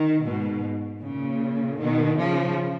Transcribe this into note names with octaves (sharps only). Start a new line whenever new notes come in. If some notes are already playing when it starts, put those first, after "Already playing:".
Already playing: D#3
G#2 B2
A#2 C#3
B2 D#3
C#3 F3